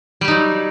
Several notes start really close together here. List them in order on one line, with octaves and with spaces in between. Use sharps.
G3 G4 D#4 F#3